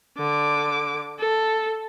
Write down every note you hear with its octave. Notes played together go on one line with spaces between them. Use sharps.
D3 D6
A4